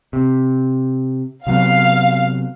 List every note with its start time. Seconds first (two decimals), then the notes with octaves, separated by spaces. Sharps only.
0.13 C3
1.47 C3 F#3 B3 F5